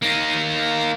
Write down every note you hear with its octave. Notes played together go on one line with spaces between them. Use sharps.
A#3 D#4